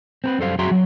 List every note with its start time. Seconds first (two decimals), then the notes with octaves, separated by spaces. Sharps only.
0.24 C4 A#4 B4
0.39 F#2 G3 A4 C5 F5
0.59 F#2 F#4 G#4 E5 A#5 C6
0.71 F#3